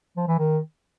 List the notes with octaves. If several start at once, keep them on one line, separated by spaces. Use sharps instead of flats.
F3
E3
D#3